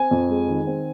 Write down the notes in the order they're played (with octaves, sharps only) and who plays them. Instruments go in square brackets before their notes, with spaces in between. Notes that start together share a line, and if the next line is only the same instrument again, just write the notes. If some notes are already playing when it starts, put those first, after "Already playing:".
Already playing: [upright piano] C4 G#5
F2
G#3
D#3
C4